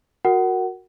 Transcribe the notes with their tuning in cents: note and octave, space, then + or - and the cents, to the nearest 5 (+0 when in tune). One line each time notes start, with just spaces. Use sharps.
F#4 -15 A#4 -15 F#5 +25